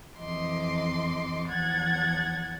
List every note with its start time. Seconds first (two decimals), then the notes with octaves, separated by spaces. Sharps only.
0.17 F2 E3 D#5 C6 D6
1.47 E2 F3 F#5 G#6 A6